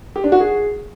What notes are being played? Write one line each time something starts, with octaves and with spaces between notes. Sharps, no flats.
G4
D4
F#4
G#4